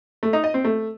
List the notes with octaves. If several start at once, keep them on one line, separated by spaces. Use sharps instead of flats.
A3
D#4
D#5
C4
A3